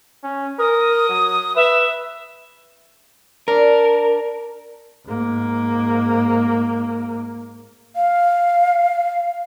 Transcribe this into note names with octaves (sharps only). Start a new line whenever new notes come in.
C#4
A#4 D#6
F#3
B4 E5
D4 A#4
G#2 A#3
F5